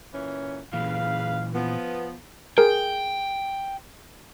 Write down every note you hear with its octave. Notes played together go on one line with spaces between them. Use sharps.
A#2 E3 C#4
A#2 C#3 E3 B4 F5
F3 B3
G#4 A#4 G5